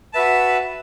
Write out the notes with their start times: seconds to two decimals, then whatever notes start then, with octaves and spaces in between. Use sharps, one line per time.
0.13 F#4 B4 E5 A5